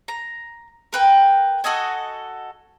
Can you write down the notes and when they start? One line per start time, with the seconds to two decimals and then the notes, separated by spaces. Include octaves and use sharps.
0.08 A#5
0.93 A#4 B4 G5
1.64 F#4 A4 D#5 G#5